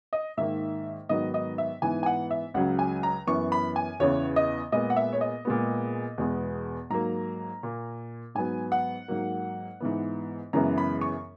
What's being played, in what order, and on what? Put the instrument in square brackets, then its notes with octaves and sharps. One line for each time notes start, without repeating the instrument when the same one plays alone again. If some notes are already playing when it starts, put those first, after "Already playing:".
[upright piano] D#5
G#2 D#3 A#3 E5
G#2 D#3 F#3 B3 D#5
D#5
E5
G#2 E3 B3 G#5
G#5
F#5
E5
C#2 C#3 F#3 F#5
G#5
A#5
F#2 E3 B3 C#6
B5
G#5
E2 C#3 E3 B3 C#5
D#5
A#2 G#3 B3 D#5
F#5
E5
C#5
D#5
A#2 G#3 B3
E2 B2 G#3 B3
G#2 F#3 A#3 A#5
A#2 A#3
G#2 F#3 B3 G#5
F#5
G#2 F#3 A#3
G#2 E3 B3
F#2 C#3 E3 G#3 B3 A#5
B5
C#6